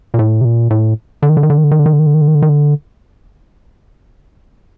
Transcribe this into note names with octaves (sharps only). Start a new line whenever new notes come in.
A#2
A2
C3
A#2
A2
D3
D#3
D3
D#3
D3
D#3
D3
D#3
D3
D#3
D3
D#3
D3
D#3
D3
D#3
D3
D#3
D3